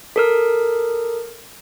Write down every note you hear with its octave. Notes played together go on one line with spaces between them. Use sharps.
A4 A#4 F6